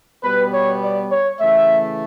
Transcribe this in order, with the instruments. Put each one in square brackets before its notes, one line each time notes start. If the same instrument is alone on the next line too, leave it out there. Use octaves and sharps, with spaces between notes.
[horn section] B2 G3 B3 B4
C#5
D5
C#5
C#3 E3 A3 E5